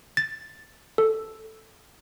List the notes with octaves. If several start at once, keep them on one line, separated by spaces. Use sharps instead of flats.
A6
A4